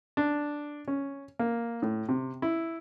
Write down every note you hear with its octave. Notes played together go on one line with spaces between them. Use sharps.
D4
C#4
A#3
A2
C3
E4